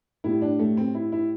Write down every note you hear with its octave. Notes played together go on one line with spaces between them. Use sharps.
A2 G3 E4
D4
A3
C4
E4
E4